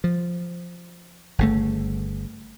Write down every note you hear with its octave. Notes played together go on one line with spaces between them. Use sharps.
F3
G1 C#3 A3